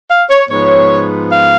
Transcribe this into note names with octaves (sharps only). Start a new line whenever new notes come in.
F5
C#5
G#2 F3 B3 C#5
F5